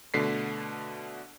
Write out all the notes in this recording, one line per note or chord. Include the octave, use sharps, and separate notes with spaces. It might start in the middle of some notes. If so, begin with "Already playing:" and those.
B2 D3 A3 B6 C7